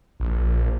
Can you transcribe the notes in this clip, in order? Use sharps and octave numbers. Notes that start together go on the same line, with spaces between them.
A#1